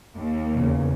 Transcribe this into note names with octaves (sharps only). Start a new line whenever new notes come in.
D#2 A#3
E2 C#3